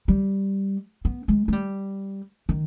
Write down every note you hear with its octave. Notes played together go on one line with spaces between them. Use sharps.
G3
B3
G#3
G#3
G3
D#3